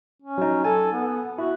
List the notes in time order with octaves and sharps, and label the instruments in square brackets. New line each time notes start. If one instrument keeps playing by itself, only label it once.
[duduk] C#4
[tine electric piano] F#3 D#4
[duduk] A4 [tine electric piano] G#5
[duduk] B3
[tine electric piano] E4 [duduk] F#4